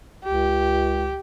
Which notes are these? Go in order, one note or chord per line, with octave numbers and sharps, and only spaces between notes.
C#2 G4